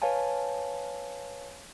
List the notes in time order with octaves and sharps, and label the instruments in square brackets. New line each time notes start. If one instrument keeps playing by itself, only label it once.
[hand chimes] B4 C#5 F5 G#5 A5